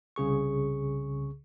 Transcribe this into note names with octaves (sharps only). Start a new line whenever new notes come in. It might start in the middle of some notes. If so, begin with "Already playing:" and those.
C2 C#3 G#4 C#6